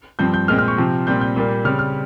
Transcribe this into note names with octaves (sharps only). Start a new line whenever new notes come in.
G2 F3 C4 G6
G6
A#2 G#3 C4 F6
F6
C#6
C3 F3 C4
A#2 G3 C4 G6
G6
A#2 G3 A#3
C#3 G3 C4 F6
F6